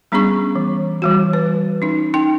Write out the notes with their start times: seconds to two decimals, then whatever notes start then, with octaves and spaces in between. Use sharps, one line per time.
0.12 G3 B3 C#4 D4 G#4 C#6
0.55 E3
1.02 E3 G3 F#4
1.33 B4
1.82 C#4 D#4
2.14 D#4 G5